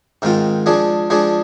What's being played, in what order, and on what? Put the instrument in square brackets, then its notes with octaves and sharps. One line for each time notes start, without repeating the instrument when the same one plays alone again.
[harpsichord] G#2 D#3 G#3 C4 F4
F3 G#3 D4 G#4
F3 G#3 D4 G#4